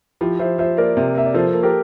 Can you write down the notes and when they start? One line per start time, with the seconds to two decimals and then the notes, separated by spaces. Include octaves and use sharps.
0.21 F3 E4 G4
0.39 F3 C5 E5
0.58 F3 C5 E5
0.77 A#3 A#4 D5
0.97 C3
1.15 A#3 E5
1.26 D5
1.34 F3 A4 C5
1.53 A#3
1.63 G4 A#4